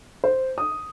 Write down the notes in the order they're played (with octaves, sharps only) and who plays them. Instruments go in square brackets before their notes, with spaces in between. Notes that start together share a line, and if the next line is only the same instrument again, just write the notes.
[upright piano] C5
D#6